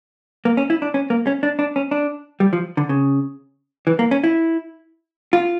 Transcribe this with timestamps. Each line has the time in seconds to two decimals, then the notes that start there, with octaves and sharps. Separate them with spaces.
0.45 A#3
0.57 C#4
0.70 E4
0.82 D4
0.94 C#4
1.10 A#3
1.27 C#4
1.43 D4
1.59 D4
1.76 C#4
1.91 D4
2.40 G3
2.53 F3
2.77 D3
2.89 C#3
3.87 E3
3.99 A#3
4.11 C#4
4.24 E4
5.33 F4